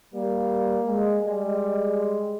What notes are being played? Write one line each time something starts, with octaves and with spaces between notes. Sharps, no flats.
G3 A#3
G#3
G3 G#3